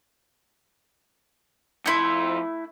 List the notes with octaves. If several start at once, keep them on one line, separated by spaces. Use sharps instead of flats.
F2 A3 E4 C6